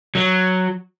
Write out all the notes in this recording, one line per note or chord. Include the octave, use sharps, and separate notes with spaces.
F#3